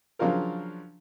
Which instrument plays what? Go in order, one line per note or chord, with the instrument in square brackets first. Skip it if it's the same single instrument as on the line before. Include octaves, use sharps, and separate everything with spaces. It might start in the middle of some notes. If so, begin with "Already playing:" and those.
[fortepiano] C#3 F3 F#3 D4 F4 A#4